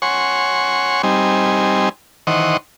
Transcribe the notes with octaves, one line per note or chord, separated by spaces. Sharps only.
C#5 F#5 G#5 C6 C#6
G3 C4 D#4 G#5
D#3 E3 C5 D#5 F#5 C#6